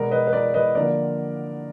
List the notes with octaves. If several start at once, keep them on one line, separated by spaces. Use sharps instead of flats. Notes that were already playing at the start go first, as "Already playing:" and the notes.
Already playing: B2 G#3 B3 A#4 D5
B4 D#5
B4
A#4 D5
B4 D#5
D3 F3 A#3 A#4 D5